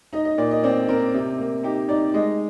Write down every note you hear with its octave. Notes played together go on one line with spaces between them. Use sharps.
D#4 D#5
D#5
A#2 D5
D#5
C4 D5
C4 A#4
C3
A#3
D#4 G4
D#4 D5
G#3 D#5